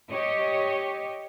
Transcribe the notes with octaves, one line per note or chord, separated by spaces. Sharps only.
G4 C#5 D#5